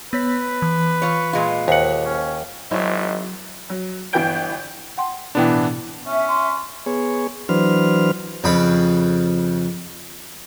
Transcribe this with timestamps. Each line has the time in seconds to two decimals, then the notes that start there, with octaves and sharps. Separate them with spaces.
0.13 B3 B4 C#5 B6
0.62 E3
1.02 F4 C#5
1.33 A#2 G#3 F4
1.68 D#2 C5 F#5
2.05 C#4
2.71 G#1 F#3 E4 C5 C#5 D#5
3.70 F#3
4.13 G1 E3 B3 G5 G6 D7
4.98 F#5 G5 C6
5.35 B2 E3 B3 D4 E4 G5
5.49 A2
6.06 C#4 E5
6.28 C6
6.86 B3 G#4 C#5
7.49 E3 F#3 D4 B4 C5 F6
8.44 F2 C#3 B5